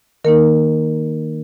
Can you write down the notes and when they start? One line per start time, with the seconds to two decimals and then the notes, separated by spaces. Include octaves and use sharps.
0.24 D#3 A#3 D#4 A#4